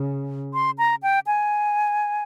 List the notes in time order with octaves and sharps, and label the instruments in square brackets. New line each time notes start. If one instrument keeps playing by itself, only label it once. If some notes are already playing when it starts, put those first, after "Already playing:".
Already playing: [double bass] C#3
[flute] C6
A#5
G5
G#5